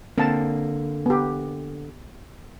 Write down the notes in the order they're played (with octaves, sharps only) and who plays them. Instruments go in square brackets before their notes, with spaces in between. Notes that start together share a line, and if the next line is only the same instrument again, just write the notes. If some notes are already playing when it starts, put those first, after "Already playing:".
[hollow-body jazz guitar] D3 A#3 [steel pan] C4 A5
[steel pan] B3 G4